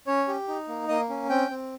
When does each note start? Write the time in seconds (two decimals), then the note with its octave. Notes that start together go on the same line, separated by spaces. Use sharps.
0.07 C#4 C#5
0.28 G4
0.48 D#4
0.68 A#3
0.88 A#3 D#5
1.10 C#4
1.30 C4 G5
1.50 C4